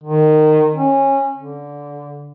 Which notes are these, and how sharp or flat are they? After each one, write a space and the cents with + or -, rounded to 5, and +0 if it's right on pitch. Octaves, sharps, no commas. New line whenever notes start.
D#3 -15
C#4 -20
D3 -20